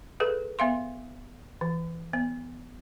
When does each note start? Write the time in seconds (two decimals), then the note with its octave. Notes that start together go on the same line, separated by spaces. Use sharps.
0.20 G#4 A4 B4
0.59 B3 E5 F5 C6
1.61 E3
2.13 B3